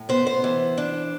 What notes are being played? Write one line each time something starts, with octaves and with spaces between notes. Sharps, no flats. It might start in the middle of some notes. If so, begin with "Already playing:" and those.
Already playing: A2
B3 C5
C5
E3
D4